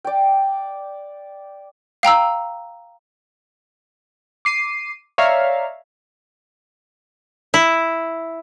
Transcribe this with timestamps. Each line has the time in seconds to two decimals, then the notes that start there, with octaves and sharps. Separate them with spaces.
0.04 D5 G5
2.03 F5 G5 A#5 E6
4.45 D6 C7 D#7
5.18 C#5 D5 E5 F5 A#5
7.54 E4